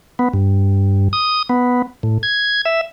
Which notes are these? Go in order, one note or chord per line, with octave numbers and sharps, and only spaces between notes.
B3
G2
D#6
B3
A2
G#6
E5